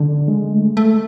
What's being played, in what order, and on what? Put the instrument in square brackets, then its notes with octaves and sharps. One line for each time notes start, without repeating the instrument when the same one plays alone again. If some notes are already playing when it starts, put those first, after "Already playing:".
Already playing: [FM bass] D3
G#3
A3
A3